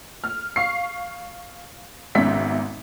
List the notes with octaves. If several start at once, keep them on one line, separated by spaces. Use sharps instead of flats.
F6
F5 C#6 C7
G#1 G#2 B2 C#4 E5 B6